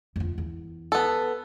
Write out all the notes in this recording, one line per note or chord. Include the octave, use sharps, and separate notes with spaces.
F2 F3
E2
B3 A4